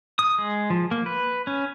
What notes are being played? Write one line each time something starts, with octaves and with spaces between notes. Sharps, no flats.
D#6
G#3
F3
A#3
B4
C#4